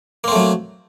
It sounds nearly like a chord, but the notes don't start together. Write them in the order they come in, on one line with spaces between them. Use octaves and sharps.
A#3 C4 A3 F#3